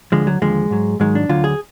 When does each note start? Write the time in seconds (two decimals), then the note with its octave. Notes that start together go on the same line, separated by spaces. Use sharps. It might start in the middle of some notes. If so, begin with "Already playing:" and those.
0.12 D2 D3 F3 G#3
0.27 F#3
0.42 D#2 D3 F3 G#3
0.70 G#2 F#3
1.00 G#2 D#3 F#3 G#3
1.15 D4
1.29 D2 D3 F#3 F4
1.44 G#4